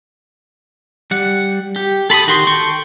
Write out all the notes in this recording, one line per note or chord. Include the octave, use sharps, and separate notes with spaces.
G3 F#5
G4
A4 B5 C6 D#6
D#3 F#4 G4 C6
A4 G5 C6 C#6